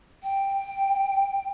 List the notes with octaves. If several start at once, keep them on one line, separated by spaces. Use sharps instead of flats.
G5